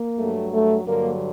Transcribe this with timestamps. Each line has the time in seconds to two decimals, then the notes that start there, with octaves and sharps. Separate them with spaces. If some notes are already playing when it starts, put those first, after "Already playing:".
Already playing: A#3
0.18 G2 F#3 A3
0.52 A3
0.86 G2 D3 F#3 A#3